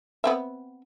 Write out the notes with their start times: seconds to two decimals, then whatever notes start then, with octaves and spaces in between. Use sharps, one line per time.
0.24 B3 C4 E5